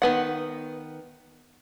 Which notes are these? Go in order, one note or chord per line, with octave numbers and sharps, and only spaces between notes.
D#3 B3 F#5